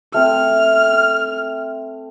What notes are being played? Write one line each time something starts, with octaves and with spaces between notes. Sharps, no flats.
A3 C4 F6